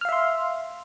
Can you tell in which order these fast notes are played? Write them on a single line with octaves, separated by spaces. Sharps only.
F6 F5 E5 C6